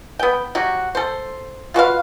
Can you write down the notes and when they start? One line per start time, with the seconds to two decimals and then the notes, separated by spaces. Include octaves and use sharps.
0.19 B3 G5
0.55 F#3 F#4 G4
0.95 A4 C5
1.74 F4 F#4 B4 F5